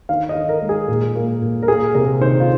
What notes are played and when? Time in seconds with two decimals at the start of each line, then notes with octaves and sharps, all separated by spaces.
0.09 D#3 F5
0.29 D#5
0.35 D#3
0.49 A#4
0.62 G#3
0.69 G#4
0.88 A#2
1.16 A#3
1.42 A#2
1.63 A#4
1.67 A#3 G#4
1.94 C3 A#4
2.21 D#3 C5
2.40 F4